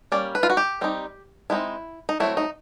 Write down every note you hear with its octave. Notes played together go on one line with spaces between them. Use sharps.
G3 A#3 C#4 D5
B4
F4
F#4
G4
G3 C4 D#4
G#3 C4 D#4 E4
D#4
F#3 A3 C4 E4
D#4